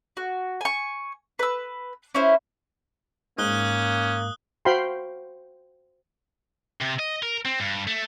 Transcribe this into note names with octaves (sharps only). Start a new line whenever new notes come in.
F#4
G#5 C#6
B4 E6
C#4 E4 C5
G#2 A#3 C#4 D#6 F#6 G7
F#4 C5 F5 G5 B5 C6
C3
D#5
A#4
C4
G2
A3